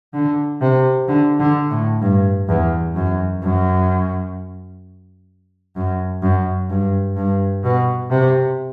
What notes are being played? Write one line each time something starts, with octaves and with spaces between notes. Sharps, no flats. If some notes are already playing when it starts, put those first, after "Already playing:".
D3
C3
D3
D3
A2
G2
E2
F#2
F#2
F#2
F#2
G2
G2
B2
C3